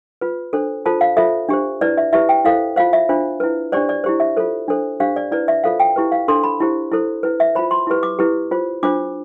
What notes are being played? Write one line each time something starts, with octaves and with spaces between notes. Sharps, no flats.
F4 B4
D4 A4 C5
F4 A4 C5 A5
F5
F4 A4 C5 E5
D4 G4 C5
E4 B4 D5
E5
E4 G4 B4 E5
G5
E4 A4 C5 F5
F4 C5 F5
E5
D4 F4 C5
E4 B4
D4 G4 C5 D5
D5
E4 G4 C5
E5
F4 A4 C5
D4 A4 C5
D4 G4 C5 F5
D5
E4 B4 D5
E5
F4 A4 C5 F5
G5
E4 G4 B4
F5
D4 A4 C5 C6
B5
E4 G4 C5
E4 A4 C5
E4 B4
E5
F4 C5 B5
C6
E4 G4 B4
D6
E4 G4 B4
F4 C5
D4 F4 C5 D6